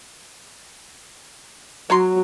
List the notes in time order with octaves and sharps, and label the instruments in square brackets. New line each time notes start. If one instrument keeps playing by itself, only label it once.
[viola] F#3 [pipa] C#5 A#5 C6